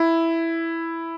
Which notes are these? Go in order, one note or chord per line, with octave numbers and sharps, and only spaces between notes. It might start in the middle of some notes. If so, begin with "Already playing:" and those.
Already playing: E4